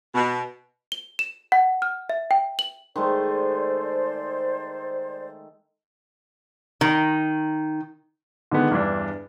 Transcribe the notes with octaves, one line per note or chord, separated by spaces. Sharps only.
B2
G7
E7
F#5
F6
E5
G5
F#7
D#3 G#3 A3 C5 D5
D#3
D3 D#3 G#3 B3
E2 G2 D4